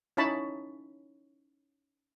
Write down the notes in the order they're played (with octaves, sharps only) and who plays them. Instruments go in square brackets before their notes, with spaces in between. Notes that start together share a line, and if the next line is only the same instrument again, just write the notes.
[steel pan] C#4 D#4 E4 C#5 A5 B5